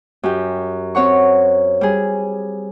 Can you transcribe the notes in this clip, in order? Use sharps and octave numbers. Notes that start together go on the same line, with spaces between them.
F#2 G4
C4 C#5 F#5 C#6
G3 G#4